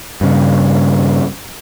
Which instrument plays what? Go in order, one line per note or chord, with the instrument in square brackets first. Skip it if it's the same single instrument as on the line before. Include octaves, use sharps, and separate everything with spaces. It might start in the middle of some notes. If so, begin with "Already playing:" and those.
[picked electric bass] G2 C#3